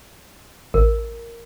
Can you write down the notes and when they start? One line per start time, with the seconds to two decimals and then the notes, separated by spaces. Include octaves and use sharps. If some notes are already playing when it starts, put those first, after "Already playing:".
0.74 A1 A#4